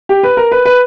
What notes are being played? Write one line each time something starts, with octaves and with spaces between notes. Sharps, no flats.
G4
B4
A#4
B4
B4